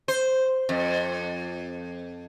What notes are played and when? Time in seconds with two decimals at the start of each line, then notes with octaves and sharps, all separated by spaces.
0.08 C5
0.69 F2